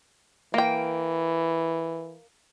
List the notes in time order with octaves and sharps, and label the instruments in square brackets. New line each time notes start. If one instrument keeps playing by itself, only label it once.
[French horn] E3 [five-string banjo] A#3 G5